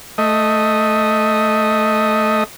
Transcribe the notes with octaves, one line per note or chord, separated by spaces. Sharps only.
A3 D#5